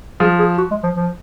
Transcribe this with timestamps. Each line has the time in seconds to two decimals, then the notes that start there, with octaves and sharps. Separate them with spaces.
0.20 F3 G#4
0.39 G#4
0.58 F#4
0.71 G#3
0.83 F3
0.96 F3